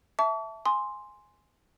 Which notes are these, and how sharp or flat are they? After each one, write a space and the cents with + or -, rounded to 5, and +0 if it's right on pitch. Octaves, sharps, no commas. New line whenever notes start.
E5 +0 A5 +0 C#6 +45
G#5 +0 C6 +0 D#6 +0